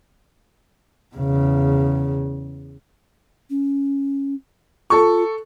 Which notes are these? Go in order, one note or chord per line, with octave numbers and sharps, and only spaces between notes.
E2 C#3
C#4
F4 A4 C#6